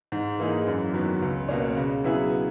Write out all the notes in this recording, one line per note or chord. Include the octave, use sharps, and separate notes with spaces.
G#2
E3 A#3 D#4 G#4
F#2
D#3 F#3 B3
C#2
B2 A#3 C#4
C#3
F#3 B3 E4 G#4